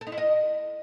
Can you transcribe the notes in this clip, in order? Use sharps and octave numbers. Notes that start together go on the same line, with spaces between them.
A4
D#4
E4
D#5